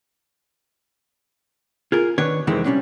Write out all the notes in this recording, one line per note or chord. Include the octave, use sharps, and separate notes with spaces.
F4 G#4 A#4
D#3 D4 B4 C#5
F2 C3 D#3 E3 G#3 C4
C3 F3 G3 C#4 D4